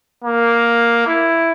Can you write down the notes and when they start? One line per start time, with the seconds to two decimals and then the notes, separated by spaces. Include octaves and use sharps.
0.24 A#3
1.07 E4